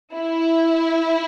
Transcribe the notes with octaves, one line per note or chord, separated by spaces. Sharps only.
E4